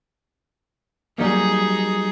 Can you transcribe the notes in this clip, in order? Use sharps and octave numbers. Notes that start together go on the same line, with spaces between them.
F#3 G3 A#3 D#4 G#4